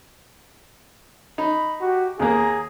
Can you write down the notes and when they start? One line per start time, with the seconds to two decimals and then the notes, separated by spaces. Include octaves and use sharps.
1.38 D#4 B5
1.81 F#4 G4
2.19 D#2 A#3 G#4 A#5